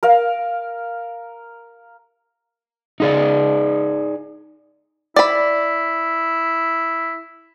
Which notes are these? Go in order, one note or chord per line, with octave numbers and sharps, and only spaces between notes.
A#4 F5
D#4 G#4 D5
E4 D5 B5